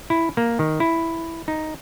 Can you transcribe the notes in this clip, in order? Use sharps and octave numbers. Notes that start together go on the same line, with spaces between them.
E4
A#3
D#3
E4
D#4